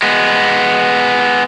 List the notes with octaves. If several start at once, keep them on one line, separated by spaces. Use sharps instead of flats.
G#3 B3